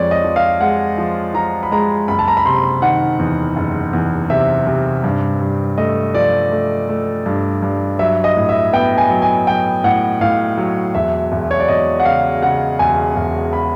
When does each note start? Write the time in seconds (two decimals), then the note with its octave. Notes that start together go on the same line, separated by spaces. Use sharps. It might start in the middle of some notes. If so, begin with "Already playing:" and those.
Already playing: F2 F3 G#3 C#5 D5
0.11 D#5
0.24 F3
0.36 F5
0.61 G#3 F#5
0.98 F3
1.34 F3 A#5
1.63 B5
1.71 G#3 A#5
2.08 F#1 B5
2.19 A5
2.28 A#5
2.37 B5
2.46 C3 C6
2.82 D#3 F#5
3.19 E2
3.56 F#1
3.93 E2
4.30 C3 E5
4.67 C3
5.04 G2
5.40 G2
5.78 A3 D#5
6.14 F3 D5
6.52 A3
6.89 A3
7.26 G2
7.62 G2
7.99 F#3 E5
8.24 D#5
8.37 A2
8.49 E5
8.73 B3 G5
8.98 G#5
9.10 F#3
9.22 G#5
9.47 F#3 G5
9.84 A2 F#5
10.21 A2 F5
10.58 F#3
10.95 E1 E5
11.32 E1
11.51 C#5
11.60 D5
11.69 E1 D#5
12.00 F#5
12.05 C#3 F5
12.42 C#3 F#5
12.79 E1 G#5
13.16 E1
13.53 B5